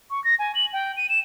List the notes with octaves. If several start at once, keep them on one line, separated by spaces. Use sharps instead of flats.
C#6
A#6
G#5
F#7
G5
D#7
E7